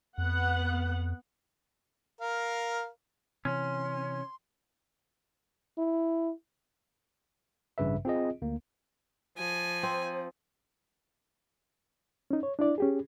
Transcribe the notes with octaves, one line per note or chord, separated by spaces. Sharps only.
F2 B3 F#5
A#4 F5
C3 E3 C#4 C6
E4
A1 G2 C#3 B4 E5
C4 F4 G#4 D#5
D2 A#3
F3 G#5
C4 C5
C#4 D#4
C#5
D4 E4 D5
C#4 G4 G#4